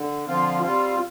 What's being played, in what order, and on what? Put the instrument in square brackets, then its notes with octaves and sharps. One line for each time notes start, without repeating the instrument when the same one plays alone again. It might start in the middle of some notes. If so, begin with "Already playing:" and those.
Already playing: [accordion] D3
D3 F3 C4 F4
G3 C4 F4